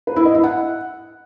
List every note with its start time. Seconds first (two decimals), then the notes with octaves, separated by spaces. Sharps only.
0.07 B4
0.16 E4
0.25 D#5
0.34 E4
0.44 F#5